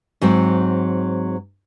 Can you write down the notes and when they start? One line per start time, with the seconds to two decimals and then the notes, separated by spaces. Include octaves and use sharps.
0.21 G#2 F#3 C4